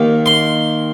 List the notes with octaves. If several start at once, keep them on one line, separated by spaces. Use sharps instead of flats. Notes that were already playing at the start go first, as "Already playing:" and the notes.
Already playing: D#2 D#3 A#3
C6